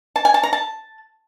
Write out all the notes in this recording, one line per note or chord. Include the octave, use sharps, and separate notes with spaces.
A5
G#5
A5
A#5
A5